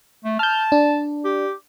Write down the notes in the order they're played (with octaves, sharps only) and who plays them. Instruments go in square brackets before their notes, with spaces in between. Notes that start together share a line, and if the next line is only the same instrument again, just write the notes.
[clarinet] A3
[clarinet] A5 [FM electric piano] F6 G6
[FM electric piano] D4
[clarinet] G4